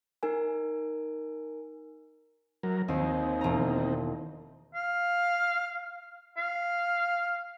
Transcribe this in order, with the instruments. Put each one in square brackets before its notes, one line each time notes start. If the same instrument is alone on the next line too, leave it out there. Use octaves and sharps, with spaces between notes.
[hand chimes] D#4 A#4 G#5
[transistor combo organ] F#3 A#4
[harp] D#2 [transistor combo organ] C4 D#4
[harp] E1 A#5
[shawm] F5
F5